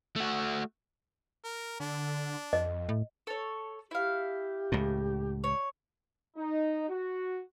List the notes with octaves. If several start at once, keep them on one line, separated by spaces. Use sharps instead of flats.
A3 F#4
A#4
D3 D4
F2 D#5
A2
A4 C#5
E4 G4 F5
C#2 A2
C#5
D#4
F#4